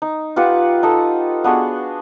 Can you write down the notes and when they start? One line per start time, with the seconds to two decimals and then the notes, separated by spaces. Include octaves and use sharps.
0.02 D#4
0.36 F4 G4 B4 F#5
0.83 D#4 A4 D#5
1.44 B3 D4 F#4 G#4